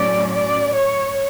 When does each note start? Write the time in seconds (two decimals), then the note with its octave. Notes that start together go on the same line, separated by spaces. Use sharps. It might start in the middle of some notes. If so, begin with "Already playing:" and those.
Already playing: A2 F#3 C#4 D5
0.33 D5
0.75 C#5